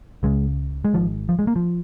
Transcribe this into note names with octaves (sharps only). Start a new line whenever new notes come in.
C#2 C#3 G#3
G#3
G#1 G#2 F3
F3
G#3
A#3
F3